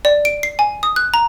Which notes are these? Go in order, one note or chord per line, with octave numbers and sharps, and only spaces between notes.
D5
D7
C7
G#5
D#6
F#6
A#5